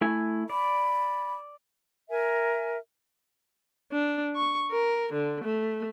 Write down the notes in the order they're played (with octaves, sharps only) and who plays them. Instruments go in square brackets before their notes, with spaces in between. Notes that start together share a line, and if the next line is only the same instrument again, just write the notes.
[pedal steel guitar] A3 E4 G#5
[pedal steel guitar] D5 [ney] B5
[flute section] A#4 E5 G#5
[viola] D4
C#6
A#4
D3
A3